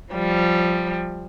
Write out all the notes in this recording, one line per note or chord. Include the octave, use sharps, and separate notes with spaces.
F3 G3